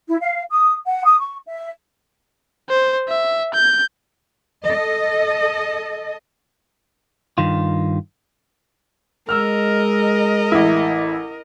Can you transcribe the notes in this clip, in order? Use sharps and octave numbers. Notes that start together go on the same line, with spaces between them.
E4
F5
D#6
F#5
D#6
C#6
E5
C5
E5
G6
A4 D#5
G2 D#3 F4
G#3 A#4 D#5 E6 F6
A1 E4